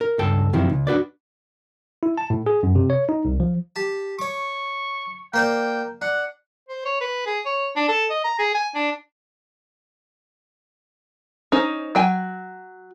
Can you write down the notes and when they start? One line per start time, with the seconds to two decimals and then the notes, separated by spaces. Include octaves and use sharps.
0.01 A#4
0.19 C#2 G2 A4 G5
0.53 F#2 C3 D#3 F3 E4
0.70 C#2
0.87 D4 F#4 B4 D5
2.03 E4
2.18 A5
2.30 A2
2.46 G#4
2.63 F#2
2.75 C3
2.90 C#5
3.09 D#4
3.25 C2
3.40 F3
3.76 G4 A5
4.19 C#5 C#6 D6
5.34 A#3 C5 D5 G5
6.02 D4 F#5
6.69 C5
6.85 C#5
7.01 B4
7.26 G#4
7.46 C#5
7.76 D4
7.88 A4
8.10 D#5
8.24 A#5
8.39 G#4
8.54 G#5
8.75 D4
11.52 C#4 D#4 C5
11.95 F#3 G5 G#5